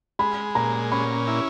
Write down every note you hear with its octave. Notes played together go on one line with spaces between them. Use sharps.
G#3 B5
A#2 A#5
C#4 B5
E4